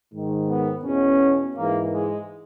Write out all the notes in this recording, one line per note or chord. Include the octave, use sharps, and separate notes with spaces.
G#2 D#3
B3
E2 B2 C#4
G#2 E3 A#3
G#3